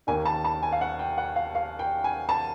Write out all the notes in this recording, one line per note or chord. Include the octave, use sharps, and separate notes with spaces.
D#2 D#3 G#5
A5
A5
G#5
F5
F#5
G5
F#5
F5
F5
G5
G#5
A5